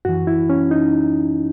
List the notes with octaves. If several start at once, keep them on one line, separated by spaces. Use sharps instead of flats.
F#2 E3 F#4
E4
C#4
D#4